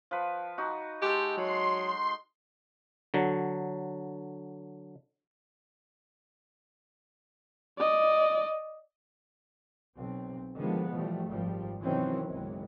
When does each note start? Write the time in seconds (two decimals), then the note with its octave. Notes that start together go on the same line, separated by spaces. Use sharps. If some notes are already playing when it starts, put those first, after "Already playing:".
0.11 F3 B4
0.58 D#4 F#4
1.02 G#3 G4 A4
1.37 F#3 C6
3.14 D3 F#3
7.78 D5 D#5
9.96 B1 C4
10.56 D3 D#3 F3 G3 G#3 B3
10.92 B2 E3 F3 G3 A3
11.27 G#1 F#2 F3 G3
11.84 C3 D#3 E3 F#3 C4 C#4
12.25 F#1 B1 D#3 E3 G#3 B3